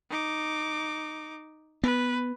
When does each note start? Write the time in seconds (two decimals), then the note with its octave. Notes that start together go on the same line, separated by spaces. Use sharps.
0.10 D#4 D6
1.84 B3 B4